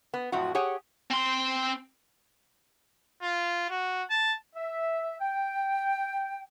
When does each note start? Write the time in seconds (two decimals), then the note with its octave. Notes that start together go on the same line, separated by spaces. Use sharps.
0.14 B3
0.32 F2 A2 F3 F#3 F#4
0.55 G4 G#4 C#5 F#5
1.11 C4 C6
3.22 F4
3.70 F#4
4.10 A5
4.55 E5
5.21 G5